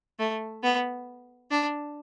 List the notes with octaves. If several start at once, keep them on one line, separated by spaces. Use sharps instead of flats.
A3
B3
D4